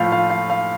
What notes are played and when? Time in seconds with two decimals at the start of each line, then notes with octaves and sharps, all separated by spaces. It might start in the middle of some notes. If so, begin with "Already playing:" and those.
Already playing: A2 F3 A3 F5
0.12 F5
0.30 F5
0.50 F5